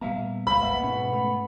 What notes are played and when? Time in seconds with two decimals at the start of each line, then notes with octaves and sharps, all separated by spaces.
0.01 A#2 G3 B3 E5 F5 A#5
0.47 C#2 G#3 C5 F5 B5
0.62 G1 G#2 A#3 B3 D5 E5
0.83 G#2 B2 C#4
1.13 A3